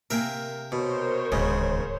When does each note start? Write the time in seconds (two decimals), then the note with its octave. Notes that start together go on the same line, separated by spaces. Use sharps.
0.10 C3 A#3 A#4 E5 G5 G#5
0.72 B2 A#4 C5 C#5
1.32 D1 D#2 G#2 C#3 B3 D#5